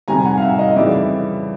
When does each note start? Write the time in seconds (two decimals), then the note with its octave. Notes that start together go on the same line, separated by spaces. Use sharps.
0.08 F2 C3 D#3 G3 G#5 A#5
0.25 F#5 G#5
0.37 F5
0.42 E5 F#5
0.59 D#5 F5
0.76 F2 C#3 E3 G3 D5 E5